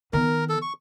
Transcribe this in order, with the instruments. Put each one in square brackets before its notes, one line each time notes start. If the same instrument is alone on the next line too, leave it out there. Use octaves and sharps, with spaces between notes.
[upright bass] D#3 B3 [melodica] A#4
[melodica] A4
C#6